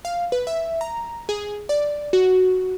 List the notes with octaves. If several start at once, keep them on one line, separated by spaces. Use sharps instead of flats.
F5
B4
E5
A#5
G#4
D5
F#4